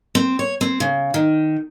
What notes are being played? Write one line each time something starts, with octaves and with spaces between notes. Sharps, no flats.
C4
C#5
C4
C#3
D#3